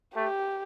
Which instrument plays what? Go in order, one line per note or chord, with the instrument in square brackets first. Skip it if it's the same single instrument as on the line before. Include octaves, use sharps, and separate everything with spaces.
[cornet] A3 [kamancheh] G4